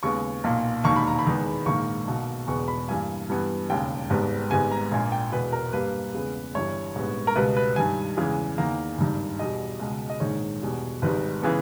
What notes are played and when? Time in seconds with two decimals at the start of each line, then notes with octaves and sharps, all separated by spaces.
0.03 D#2 C#3 G#3 B3 C#6
0.44 B1 A#2 A#3
0.84 E1 D#2 D#3 A#3 C#6
0.96 B5
1.08 A#5
1.19 B5
1.26 E2 D#3 G#3 B3
1.65 A#1 G#2 D#3 A#3 C#6
2.07 B1 B2 A#3
2.47 E1 E2 B2 G#3 B3 C#6
2.68 B5
2.88 G2 E3 A#3 G#5
3.29 G2 E3 G3 B3
3.69 E1 D#2 C#3 G#3 G5
4.10 G#1 G#2 G3 B3
4.51 G#1 G#2 G3 B3 G#5
4.72 A#5
4.92 A#1 A#2 A#3 G#5
5.12 G5
5.32 E1 E2 B2 B4
5.52 A#4
5.73 G2 G3 A#3 B4
6.14 E2 C#3 G#3 B3
6.55 G1 G2 E3 G3 C#5
6.95 A#1 G#2 G3 B3
7.27 A#4
7.36 C#2 B2 G3 B3 B4
7.57 B4
7.76 G2 D#3 G3 G#5
8.17 E2 C#3 E3 G#3
8.58 E2 D#3 A#3 A#5
8.98 G#1 G2 D#3
9.39 E2 B2 G3 D#5
9.79 C#2 B2 G#3
10.10 D#5
10.20 A#1 G#2 D#3 G#3 C#5
10.62 E2 B2 G3
11.02 G#1 G#2 D#3 G3 B4
11.42 C#3 E3 G#3 B3